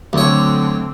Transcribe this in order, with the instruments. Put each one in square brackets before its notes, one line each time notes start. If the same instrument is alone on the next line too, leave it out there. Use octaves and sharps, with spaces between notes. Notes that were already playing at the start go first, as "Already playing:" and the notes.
[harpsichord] D2 C#5 [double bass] D3 C4 [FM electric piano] F#3 A3